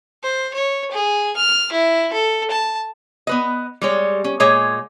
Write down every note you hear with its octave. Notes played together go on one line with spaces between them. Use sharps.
C5
C#5
G#4
F6
E4
A4
A5
B3 B4 D#5
G3 G#3 C#5
C#4
A#2 G#3 G#4 C#5 D#5